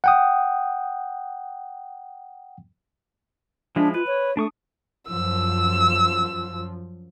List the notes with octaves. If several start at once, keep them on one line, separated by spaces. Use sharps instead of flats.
F#5 G5 D#6
F3 G#3 D4 E4
F4 B4
C#5
A3 D4 C#6 D#6
F#2 F3 E6